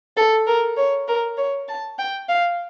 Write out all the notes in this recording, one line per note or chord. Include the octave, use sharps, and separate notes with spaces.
A4
A#4
C#5
A#4
C#5
A5
G5
F5